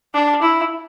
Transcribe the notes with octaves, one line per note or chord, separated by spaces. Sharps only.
D4
E4